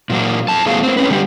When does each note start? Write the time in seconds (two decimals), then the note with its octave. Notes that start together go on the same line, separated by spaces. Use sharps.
0.09 A#2 F#3 A#3
0.48 F2 A5
0.66 E2 G3 A3 B3 G#4 F5
0.83 A#3 C4
0.97 C4 C#4 B4
1.09 D3 G3 G4